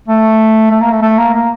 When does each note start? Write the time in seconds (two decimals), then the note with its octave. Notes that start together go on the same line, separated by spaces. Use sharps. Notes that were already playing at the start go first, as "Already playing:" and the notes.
0.08 A3
0.71 A3
0.81 A#3
0.91 A3
1.02 A3
1.18 A#3
1.33 A#3